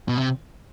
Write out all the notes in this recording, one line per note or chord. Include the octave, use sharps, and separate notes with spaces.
B2
C3